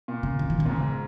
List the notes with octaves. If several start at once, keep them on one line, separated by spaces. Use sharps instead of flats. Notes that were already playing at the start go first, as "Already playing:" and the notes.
A#2
C#3
C#3
D#3
C#3
A#2
G#2